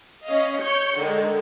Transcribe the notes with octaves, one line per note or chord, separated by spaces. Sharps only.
C#4 D#5 F5
C#5 G6 C#7
D3 D#3 G#3